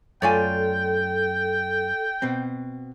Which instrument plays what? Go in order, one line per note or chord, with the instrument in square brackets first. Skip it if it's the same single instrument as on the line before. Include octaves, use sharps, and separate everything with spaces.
[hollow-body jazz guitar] F#2 A3 F4 [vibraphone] A4 [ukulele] C#5 D5 G#5 [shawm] G5
[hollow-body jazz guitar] B2 C4